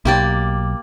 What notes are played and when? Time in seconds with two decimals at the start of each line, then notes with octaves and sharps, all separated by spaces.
0.05 B1 A#3 G4 D5